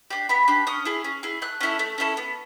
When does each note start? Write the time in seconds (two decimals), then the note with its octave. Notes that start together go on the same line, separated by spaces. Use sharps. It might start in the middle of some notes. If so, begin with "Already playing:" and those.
0.10 D4 G4
0.29 B3 B5
0.48 D4 G4
0.67 C#4 D#6
0.85 E4 G#4
1.04 C#4
1.23 E4 G#4
1.42 A3 F#6
1.61 C#4 E4 A4
1.79 A3
1.98 C#4 E4 A4
2.17 B3